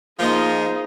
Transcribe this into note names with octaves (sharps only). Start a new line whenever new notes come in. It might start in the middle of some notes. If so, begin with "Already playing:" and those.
F3 A#3 D#4 F4 G#4 D#5